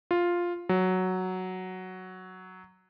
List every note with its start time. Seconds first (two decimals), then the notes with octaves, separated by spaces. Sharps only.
0.11 F4
0.69 F#3